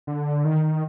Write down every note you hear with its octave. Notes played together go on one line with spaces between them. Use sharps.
D3
D#3